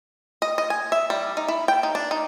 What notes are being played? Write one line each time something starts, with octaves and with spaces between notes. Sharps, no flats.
D#5
D#5
G#5
E5
G3
D#4
E4
G5
D#4
D4
D#4